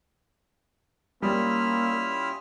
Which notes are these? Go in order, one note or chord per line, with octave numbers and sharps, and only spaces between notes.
G3 A#3 C#4 E4 F4 E5 D#6 F6